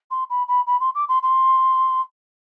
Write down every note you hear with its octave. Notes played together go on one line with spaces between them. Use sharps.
C6
B5
B5
B5
C6
D6
C6
C6